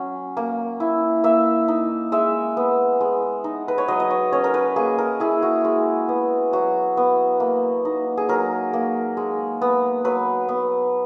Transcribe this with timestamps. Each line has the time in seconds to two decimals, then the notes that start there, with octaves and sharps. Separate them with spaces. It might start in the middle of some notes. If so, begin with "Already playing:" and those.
Already playing: F#3 C#4
0.37 A#3
0.80 E4
1.24 A#3 E5
1.68 D#4
2.12 G#3 E5
2.57 B3
3.01 G#3
3.44 D#4
3.68 B4
3.78 C#5
3.88 F#3 D#5
4.00 D#5
4.10 C#5
4.32 C#4 C#5
4.44 A#4
4.54 B4
4.76 A#3 G#4
4.98 A#4
5.20 E4 G#4
5.42 F#4
5.64 G#3
6.09 B3
6.53 F#3 F#4
6.97 B3
7.40 A#3
7.85 D#4
8.17 G#4
8.29 F#3 A#4
8.73 A#3
9.17 G#3
9.61 B3
10.04 F#3 B4
10.49 B3